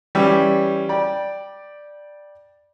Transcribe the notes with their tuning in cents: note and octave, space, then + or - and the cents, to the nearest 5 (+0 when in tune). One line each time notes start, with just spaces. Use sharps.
E3 +5 G3 +0 C#4 +0
D5 +5 G5 +0 B5 -30